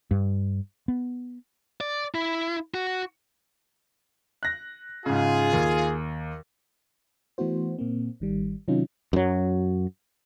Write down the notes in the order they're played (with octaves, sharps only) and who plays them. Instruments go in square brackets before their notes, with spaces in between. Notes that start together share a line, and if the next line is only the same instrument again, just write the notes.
[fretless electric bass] G2
B3
[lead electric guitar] D5
E4
F#4
[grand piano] F#6 A#6
[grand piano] G#2 C#3 [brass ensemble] F4 G#4
[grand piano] D#2
[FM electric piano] E3 A3 B3 E4 F#4 C5
A#2 A#3 C4
G#1 D#3 G3
C3 D#3 F#3 C#4 D#4 F4
[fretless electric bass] F#2 F#3